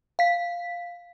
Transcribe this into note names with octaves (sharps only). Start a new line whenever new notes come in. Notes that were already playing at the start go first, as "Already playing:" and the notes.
F5 B6